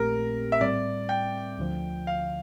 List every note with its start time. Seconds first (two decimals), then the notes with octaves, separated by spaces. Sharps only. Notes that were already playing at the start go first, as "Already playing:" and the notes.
Already playing: A#1 A#2 A3 C4 G4 A#4
0.52 E5
0.61 A2 G3 C4 D5
1.09 G5
1.58 D2 D3 F3
2.07 F5